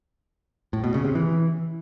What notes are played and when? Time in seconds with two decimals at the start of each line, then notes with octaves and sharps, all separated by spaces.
0.73 A2
0.84 B2
0.94 C#3
1.05 C3
1.15 E3